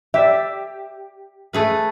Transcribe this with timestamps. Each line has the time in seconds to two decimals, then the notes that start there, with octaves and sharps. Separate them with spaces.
0.14 G4 D5 E5
1.53 A3 G#4 B4